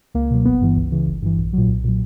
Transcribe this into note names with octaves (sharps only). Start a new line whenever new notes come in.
C#2 A#3
B2 F#3
G1 B3
G2 E3
C#2
C#3 E3
G1
G2 E3
A#1
A#2 F#3
B1
A#2 F#3